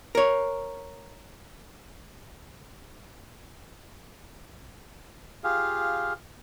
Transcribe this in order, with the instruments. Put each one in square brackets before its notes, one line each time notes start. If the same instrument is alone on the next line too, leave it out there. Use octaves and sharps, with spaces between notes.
[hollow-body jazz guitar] A#4 C#5
[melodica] F4 G4 G#4 F5